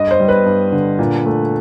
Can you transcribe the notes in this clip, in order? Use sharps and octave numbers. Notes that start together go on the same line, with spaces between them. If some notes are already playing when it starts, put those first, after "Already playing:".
Already playing: G2 D#5
C5
G3
B4
G2
D3
A#2
A3